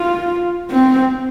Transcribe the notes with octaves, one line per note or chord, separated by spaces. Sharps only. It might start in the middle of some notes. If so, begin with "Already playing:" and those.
Already playing: F4
C4